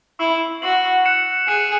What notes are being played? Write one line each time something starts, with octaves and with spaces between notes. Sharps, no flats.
E4 C#6 E6 C7 F#7
F#4 C#6 E6 C7 F#7
F#6 C#7 E7
G#4 F#6 C#7 E7